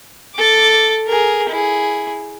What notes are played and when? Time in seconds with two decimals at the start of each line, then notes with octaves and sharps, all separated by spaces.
0.35 A4 D6
1.07 G#4 A#4
1.49 E4 G#4